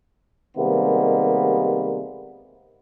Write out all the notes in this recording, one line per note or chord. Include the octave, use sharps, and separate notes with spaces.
C3 D#3 G3 G#3 A#3 B3